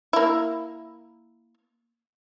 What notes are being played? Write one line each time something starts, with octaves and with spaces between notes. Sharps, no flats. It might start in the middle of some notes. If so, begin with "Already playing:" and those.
A#3 E4